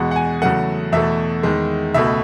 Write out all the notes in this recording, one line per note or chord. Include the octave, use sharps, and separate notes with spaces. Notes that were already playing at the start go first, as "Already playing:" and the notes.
Already playing: E2 B2 G#3 F#5
F#5
G#5
E2 C#3 F#3 A3 F#5
E2 B2 A3 E5
E2 D#3 G#3
C#2 B2 A3 E5